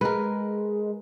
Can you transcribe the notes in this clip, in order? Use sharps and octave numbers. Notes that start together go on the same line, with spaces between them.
G#3 A#4 B4